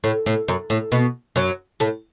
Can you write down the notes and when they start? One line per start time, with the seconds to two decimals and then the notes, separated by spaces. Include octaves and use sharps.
0.04 A2
0.26 A2
0.48 F#2
0.70 A2
0.92 B2 B3
1.36 F#2 F#3
1.80 A2 A3